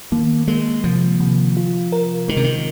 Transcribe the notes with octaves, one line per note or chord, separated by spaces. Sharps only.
D#3 A#3
G#3 A#3
C3 F3
C3
F4
A#4
D#3 G#3
C3
D#3